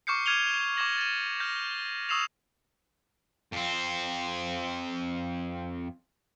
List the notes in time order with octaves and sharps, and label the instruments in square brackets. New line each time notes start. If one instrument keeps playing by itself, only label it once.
[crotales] C#6 D6 F6 G6 C7 C#7
D6 F6 G#6 D#7 F7 G7
C#6 D6 G#6 A#6 F#7
A6 D#7
F6 G6 A#6
C#6 D#6 E6 C7 E7 F7
[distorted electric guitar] F2 C4